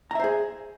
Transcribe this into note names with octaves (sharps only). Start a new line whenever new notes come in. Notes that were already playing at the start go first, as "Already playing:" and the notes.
G#4 C5 E5 A#5